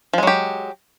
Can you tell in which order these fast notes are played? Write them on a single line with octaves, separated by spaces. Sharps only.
F3 G#3 F#3 G4